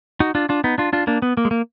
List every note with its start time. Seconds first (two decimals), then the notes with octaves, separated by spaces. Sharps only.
0.20 D#4 F#4
0.35 D4 F4
0.49 D4 F4
0.64 B3 D#4
0.78 D4 F4
0.93 D4 F4
1.07 A#3 D4
1.22 B3
1.37 A#3
1.45 G#3
1.51 A#3